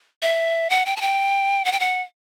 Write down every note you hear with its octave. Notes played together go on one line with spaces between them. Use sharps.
E5
F#5
G5
A5
G5
F#5
G5
F#5